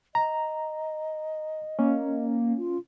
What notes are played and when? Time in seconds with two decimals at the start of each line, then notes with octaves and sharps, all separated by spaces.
0.15 D#5 A#5
1.79 A#3 C#4
2.57 F4